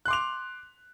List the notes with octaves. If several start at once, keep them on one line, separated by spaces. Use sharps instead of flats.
C6 D6 F#6 F7